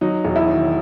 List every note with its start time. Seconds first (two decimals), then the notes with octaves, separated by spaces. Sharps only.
0.01 F#3 D#4
0.24 E1
0.36 E4
0.47 D#3